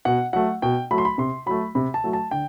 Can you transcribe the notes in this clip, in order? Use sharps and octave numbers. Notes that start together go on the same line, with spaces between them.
B2 F#5
F#3 A3 F#5
B2 G5
F#3 A3 B5
C6
B5
C3 C6
F#3 A3 B5
C3 B5
A5
F#3 A3
A5
D3 G5